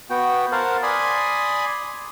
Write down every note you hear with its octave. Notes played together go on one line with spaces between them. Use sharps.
B3 F#4 G5
A#4 C5 F5 F#5 A5
D5 G#5 B5 C6 D#6